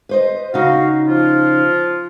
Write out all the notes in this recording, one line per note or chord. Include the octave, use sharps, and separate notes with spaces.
B4 C5 D#5
C#3 D#4 F#4 F5
F3 F4